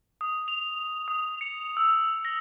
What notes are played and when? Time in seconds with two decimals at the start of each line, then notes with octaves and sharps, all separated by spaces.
0.21 D#6
0.48 F7
1.08 D#6
1.41 C#7
1.77 E6
2.25 A#6